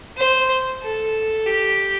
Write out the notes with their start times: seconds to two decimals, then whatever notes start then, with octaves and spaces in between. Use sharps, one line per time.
0.17 C5
0.83 A4
1.47 G4